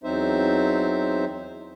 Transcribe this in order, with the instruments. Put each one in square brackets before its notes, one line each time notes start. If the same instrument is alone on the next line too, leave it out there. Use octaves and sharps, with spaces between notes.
[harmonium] E2 F#3 C4 D#4 C5 E5